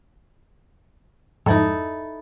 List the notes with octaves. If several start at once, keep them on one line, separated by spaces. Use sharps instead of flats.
F2 G#2 D#4 E4 A4